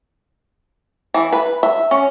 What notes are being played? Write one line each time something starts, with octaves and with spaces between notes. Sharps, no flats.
E3
B4
E5
C#4